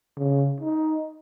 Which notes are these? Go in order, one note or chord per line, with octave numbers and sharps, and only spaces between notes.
C#3
D#4